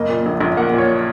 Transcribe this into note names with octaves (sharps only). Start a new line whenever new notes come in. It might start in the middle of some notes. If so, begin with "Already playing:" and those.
Already playing: F#1 A#3 D#5
A#2
A#1
A#1
A#3 F#5
A#2
C#5